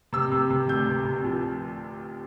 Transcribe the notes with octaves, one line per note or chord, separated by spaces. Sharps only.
C3 E6
C3
C3
D2 G6
C3
C3
F3